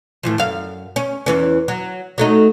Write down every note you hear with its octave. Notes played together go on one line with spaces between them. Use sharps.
A2 E3 F3
F#2 F5
C#4
E2 E3 C#4
F#3
F#3 A3 D#4